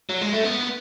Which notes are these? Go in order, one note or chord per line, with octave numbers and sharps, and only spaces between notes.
F#3
G#3
A3
B3